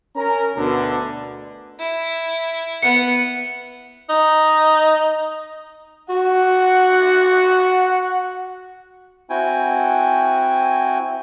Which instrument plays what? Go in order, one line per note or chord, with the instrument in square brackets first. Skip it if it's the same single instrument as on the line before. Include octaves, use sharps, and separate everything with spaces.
[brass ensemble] C#4 A#4 A#5
D2 B2 D3
[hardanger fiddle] E4
[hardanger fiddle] B3 F#5 [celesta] C#7
[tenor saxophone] D#4
[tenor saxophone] F#4 [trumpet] F#5
[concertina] C4 E4 F#4 G5 G#5